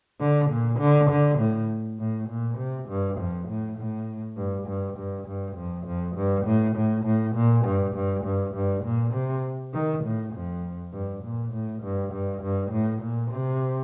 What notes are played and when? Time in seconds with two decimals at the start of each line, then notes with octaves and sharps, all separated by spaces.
0.20 D3
0.50 A#2
0.79 D3
1.10 D3
1.39 A2
2.00 A2
2.29 A#2
2.58 C3
2.89 G2
3.19 F2
3.48 A2
3.78 A2
4.37 G2
4.68 G2
4.97 G2
5.27 G2
5.56 F2
5.86 F2
6.16 G2
6.46 A2
6.76 A2
7.05 A2
7.35 A#2
7.65 G2
7.95 G2
8.25 G2
8.55 G2
8.85 A#2
9.14 C3
9.73 D#3
10.04 A2
10.34 F2
10.93 G2
11.24 A#2
11.53 A2
11.83 G2
12.13 G2
12.42 G2
12.71 A2
13.02 A#2
13.31 C3